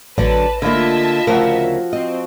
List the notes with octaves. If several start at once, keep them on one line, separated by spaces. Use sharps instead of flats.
A1 D3 F#3 D4 B4 A5
D3 A#3 E4 F4 D#5 E5 A5
D2 C#3 F3 F#4 A#4
C4 D#5